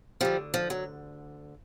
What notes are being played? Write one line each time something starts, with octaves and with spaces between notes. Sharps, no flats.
D2 D3 F3 G3
F3
F#3